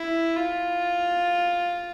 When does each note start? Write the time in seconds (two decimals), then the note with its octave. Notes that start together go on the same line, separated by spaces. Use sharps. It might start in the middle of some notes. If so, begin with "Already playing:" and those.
Already playing: E4
0.37 F4